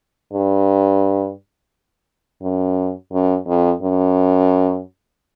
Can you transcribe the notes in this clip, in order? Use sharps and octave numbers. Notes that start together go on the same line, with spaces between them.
G2
F#2
F#2
F2
F#2